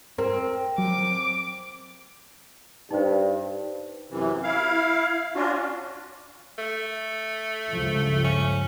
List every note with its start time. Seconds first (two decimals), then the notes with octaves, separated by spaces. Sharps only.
0.18 C4 A#4
0.78 F#3 D6
2.91 G2 D#4 C5
4.10 F#2 C3 E3
4.43 E4 F5
5.36 C#4 D4 F4 F#4
6.58 A3
7.70 C#2 G2 F3
8.24 C#4